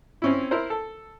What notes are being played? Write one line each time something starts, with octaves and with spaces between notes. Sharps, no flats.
C4 C#4 E4
E4 A#4 C5
A4